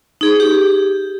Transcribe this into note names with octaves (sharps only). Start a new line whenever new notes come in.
D#4 G#4
G4